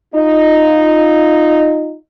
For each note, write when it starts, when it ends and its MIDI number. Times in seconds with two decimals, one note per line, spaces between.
0.15 1.96 63
0.15 1.96 65